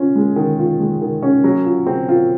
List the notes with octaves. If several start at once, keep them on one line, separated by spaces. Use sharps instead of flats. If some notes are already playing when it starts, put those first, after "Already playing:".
Already playing: C#4 F4
G#3
D#3
F4
G#3
D#3
C#4
F#3
F4
C4
F4